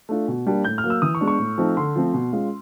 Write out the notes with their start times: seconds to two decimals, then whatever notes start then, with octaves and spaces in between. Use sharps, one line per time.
0.09 A3 D4 F4
0.28 B2
0.47 G3 A#3 D4
0.65 A2 G6
0.78 F6
0.84 F#3 A#3
0.90 E6
1.02 E3 D#6
1.15 C#6
1.21 G#3 B3 D4
1.27 C#6
1.39 A2
1.58 F3 A3 C4 D#4
1.77 D3 C6
1.96 F3 A3 C4
2.14 B2
2.33 G#3 C#4 F4